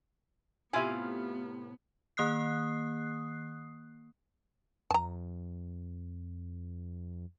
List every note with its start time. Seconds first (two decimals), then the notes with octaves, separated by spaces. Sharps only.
0.73 A2 C3 B3 E4 F4 E5 F5 G#5
2.17 D#3 A#3 D#6 F#6 C7
4.91 F2 A5 A#5